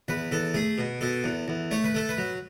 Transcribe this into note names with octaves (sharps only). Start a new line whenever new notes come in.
E2 B4
E2 A4
A3 G#4
B2
B2 A4
E2
E2
A3 C#5
B4
A3 A4
B4
F#3